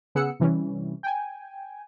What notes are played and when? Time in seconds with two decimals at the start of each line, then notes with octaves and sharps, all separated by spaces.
0.15 C#3 B3 G#4 F#5 E6 C#7
0.40 C3 E3 G3 C#4
1.03 G5 G#5